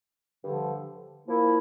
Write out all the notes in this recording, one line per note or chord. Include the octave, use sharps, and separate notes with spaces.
G2 D3 F3
A#2 F3 A#3 E4